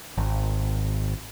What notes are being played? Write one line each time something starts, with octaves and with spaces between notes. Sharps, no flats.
G#1